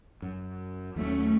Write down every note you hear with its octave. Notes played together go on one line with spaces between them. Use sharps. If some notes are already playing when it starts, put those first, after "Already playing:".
F#2
D#2 F#3 A3 C#4